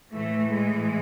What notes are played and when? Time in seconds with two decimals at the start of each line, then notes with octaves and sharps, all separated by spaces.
0.12 A2 E3 A3
0.50 G#3